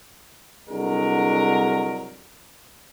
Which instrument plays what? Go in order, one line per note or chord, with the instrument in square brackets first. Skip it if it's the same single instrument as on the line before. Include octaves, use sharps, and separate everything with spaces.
[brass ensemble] C2 D3 F#3 G#3 D4 A#4